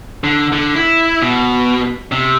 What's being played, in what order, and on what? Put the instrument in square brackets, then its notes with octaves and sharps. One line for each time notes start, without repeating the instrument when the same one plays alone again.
[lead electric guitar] D3
D3
E4
B2
C3